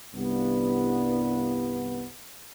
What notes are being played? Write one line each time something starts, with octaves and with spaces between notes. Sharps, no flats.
C2 G2 B3